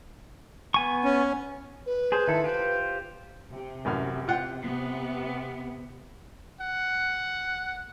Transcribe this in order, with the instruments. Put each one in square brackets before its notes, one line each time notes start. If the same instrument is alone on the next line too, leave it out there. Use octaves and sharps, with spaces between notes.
[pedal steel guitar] B3 G#5 C#6
[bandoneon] C#4
[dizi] B4
[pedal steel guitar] G#4 C5
D#3 E4 A4
F4 G4 C5
[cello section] C3
[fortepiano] A1 F#2 F6
F4 F#5 G5
[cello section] C3 B3
[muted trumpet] F#5